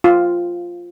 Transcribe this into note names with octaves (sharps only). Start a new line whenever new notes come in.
F4